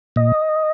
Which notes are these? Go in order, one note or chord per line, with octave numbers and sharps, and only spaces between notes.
A#2 D#5